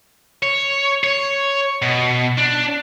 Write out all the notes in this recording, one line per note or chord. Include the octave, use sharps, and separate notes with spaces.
C#5
C#5
B2
D4